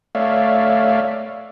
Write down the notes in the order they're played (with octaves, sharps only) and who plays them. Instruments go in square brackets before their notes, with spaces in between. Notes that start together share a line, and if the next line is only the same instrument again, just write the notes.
[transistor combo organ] A3 C#5 D5 E5 F5